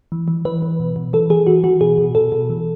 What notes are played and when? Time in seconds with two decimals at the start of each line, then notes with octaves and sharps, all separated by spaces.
0.12 E3
0.28 E3
0.45 E3 B4
0.62 E3
0.80 B2
0.96 B2
1.13 E3 A4
1.30 E3 G#4
1.47 E3 F#4
1.64 E3 F#4
1.81 B2 G#4
1.98 B2
2.15 B2 A4
2.32 B2
2.50 E3